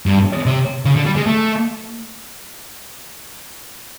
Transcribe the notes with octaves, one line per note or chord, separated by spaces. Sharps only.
G2
C3
C#3
D3
G3
G#3
A3